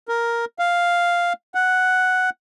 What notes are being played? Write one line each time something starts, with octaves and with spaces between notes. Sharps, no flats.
A#4
F5
F#5